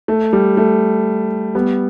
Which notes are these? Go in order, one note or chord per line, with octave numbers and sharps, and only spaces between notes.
A3
G3
A3
G3 B3